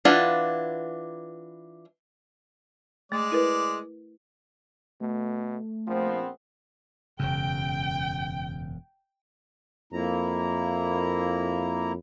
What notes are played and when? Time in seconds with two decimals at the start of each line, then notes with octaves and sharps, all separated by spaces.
0.05 E3 D4 F4 F#5
3.12 G#3 A3 D5
3.32 E4 A#4 B4
5.01 B2 A3
5.87 A#1 F3 B3 C4
7.19 E1 F#2 C#3 G5
9.93 F2 A#3 E4 A#5